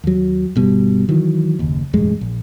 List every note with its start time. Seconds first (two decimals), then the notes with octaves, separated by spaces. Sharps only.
0.04 D#2 F#3
0.56 G1 B2 G3
1.09 D#3 E3 F#3
1.59 F#1 D#2
1.93 E1 A1 F#2 G#3
2.21 A#1